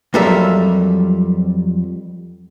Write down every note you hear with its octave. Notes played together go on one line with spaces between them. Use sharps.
F2 F#3 G3 A4 A#4 E5